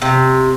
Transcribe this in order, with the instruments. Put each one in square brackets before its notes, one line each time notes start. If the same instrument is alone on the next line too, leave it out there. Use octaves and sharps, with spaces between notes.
[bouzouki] C3